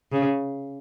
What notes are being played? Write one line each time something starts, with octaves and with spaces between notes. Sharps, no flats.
C#3